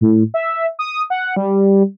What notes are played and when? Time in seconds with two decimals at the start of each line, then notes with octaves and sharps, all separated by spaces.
0.01 A2
0.34 E5
0.79 D#6
1.10 F#5
1.36 G3